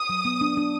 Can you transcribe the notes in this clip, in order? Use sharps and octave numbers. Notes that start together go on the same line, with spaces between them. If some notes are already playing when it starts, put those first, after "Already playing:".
Already playing: D#6
F#3
B3
D4
D4